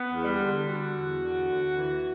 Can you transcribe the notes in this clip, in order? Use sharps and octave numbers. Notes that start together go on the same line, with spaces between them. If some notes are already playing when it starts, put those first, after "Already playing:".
Already playing: B3
E2
G3
D3
D3 F#4
E2
D3
D2
E3